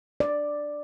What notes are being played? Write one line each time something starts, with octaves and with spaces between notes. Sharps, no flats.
D5